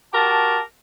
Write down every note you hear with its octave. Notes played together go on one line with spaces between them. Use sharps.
F#4 G4 A#4 A5